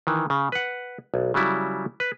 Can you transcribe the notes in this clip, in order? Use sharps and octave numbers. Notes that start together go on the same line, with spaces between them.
D#3 E3
C#3
B4 F#5
B1
C#3 F#3 G3 E4
B4